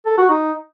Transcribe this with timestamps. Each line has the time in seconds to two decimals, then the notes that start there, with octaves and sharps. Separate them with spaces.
0.06 A4
0.18 F#4
0.29 D#4